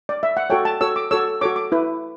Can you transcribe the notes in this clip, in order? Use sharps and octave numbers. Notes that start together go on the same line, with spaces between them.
D5
E5
F#5
F#4 A4 C#5 G5
A5
F#4 A4 C#5 E6
D6
F#4 A4 C#5 E6
F#4 A4 C#5 D6
D6
E4 B4